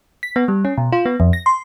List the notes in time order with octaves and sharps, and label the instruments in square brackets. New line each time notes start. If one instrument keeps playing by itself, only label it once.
[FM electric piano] B6
B3
G3
C#4
B2
F4
B3
F2
A#6
C6